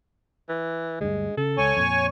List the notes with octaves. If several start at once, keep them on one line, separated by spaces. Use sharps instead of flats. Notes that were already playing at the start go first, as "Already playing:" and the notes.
E3
D2 G2 G#3
C#3 A4
C#2 C#5 G#5 C#6
F2 A#2